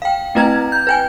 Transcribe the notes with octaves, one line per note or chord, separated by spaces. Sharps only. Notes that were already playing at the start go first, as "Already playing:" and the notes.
F5 G5
A3 C4 E4 B4 A#5 G#6
G6
B4 G5 G#5